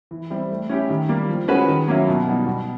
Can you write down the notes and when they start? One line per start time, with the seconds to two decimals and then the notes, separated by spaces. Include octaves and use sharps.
0.11 E3
0.30 G3 C4 E4
0.50 A3
0.69 C#4 E4 G4
0.90 D#3
1.09 G3 A#3
1.29 F3
1.48 G#3 C#4 F#4 B4
1.68 D#3
1.87 F#3 A#3 C#4 E4
2.08 B2
2.27 G3 B3 D#4 F#4
2.46 B2